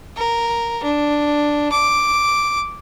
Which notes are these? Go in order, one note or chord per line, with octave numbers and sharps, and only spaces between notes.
A#4
D4
D6